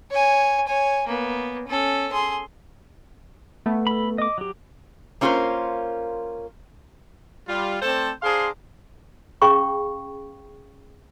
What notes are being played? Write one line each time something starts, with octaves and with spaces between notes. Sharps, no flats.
C#5 G#5
C#5 G#5
A#3 B3
C#4 A4
G#4 C6
A3 B3
A4 B5
D#5 D6
F#3 G4
A#3 C#4 F4 F#4 A#4 C5
G3 F4
A3 C4 A4 C5 D5 A5
D4 G#4 C5 F5 A#5 C6
C#4 G#4 F5 G5 B5 C#6